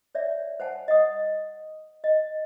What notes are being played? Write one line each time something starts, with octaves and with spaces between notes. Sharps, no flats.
C#5 D5 E5
C5 F#5 G#5 A5
D#5 F#5 D#6
D#5